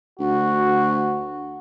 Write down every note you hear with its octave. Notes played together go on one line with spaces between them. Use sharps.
D2 F#4